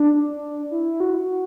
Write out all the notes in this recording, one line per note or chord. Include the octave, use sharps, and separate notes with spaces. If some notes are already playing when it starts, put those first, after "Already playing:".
Already playing: D4
E4
F#4